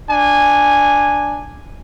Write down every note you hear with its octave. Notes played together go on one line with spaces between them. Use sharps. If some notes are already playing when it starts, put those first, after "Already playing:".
D4 G#5